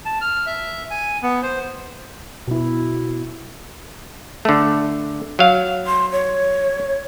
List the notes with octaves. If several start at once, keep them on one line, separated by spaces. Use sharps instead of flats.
A5
F6
E5
G#5
B3
C5
B2 E4
D3 A3
F#3 F5
C6
C#5